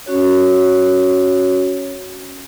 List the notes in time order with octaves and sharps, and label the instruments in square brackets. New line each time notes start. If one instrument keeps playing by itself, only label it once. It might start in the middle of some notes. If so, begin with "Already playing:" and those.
[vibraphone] C#4 F#4 C#5